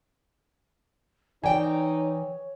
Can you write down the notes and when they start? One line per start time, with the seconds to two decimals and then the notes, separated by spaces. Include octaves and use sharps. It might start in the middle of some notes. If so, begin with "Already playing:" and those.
1.44 E3 D#4 C#5 D5 G5 G#5